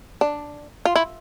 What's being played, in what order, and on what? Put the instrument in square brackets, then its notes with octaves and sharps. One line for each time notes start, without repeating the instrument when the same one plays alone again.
[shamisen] D4
F4
E4